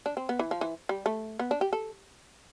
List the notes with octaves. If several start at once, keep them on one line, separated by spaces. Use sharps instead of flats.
D4
C4
B3
E3
F3
E3
G3
A3
B3
D4
G4
A4